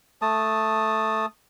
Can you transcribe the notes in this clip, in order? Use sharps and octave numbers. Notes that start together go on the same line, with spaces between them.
A3 A5 D#6